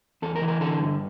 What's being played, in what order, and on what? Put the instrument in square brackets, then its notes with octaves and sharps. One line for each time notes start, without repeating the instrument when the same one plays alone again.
[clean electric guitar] E2 A4
A#4
E3
A#4
D3 A4
G2